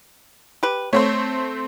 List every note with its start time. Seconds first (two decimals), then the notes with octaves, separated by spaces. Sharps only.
0.63 G4 B4
0.93 A3 C4 C5 C#5